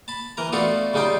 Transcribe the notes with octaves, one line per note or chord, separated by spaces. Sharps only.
A5 B5
E3 A#4 A#5
A3 B3 D4 F4 F#4 A4
C#3 G3 D#4 F4 G5